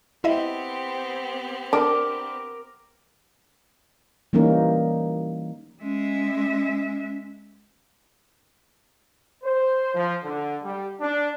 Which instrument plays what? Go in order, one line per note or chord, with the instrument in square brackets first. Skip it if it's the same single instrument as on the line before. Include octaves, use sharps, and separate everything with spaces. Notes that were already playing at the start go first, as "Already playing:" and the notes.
[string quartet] B3 C4 G4 [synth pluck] E4 D#5 E5
[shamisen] D4 [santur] A#4 D6
[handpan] E3 G3 A#3 C#4 D#4 A#4
[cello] G#3 E5 [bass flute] C#4
[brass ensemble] C5
F3
D3
G3
D4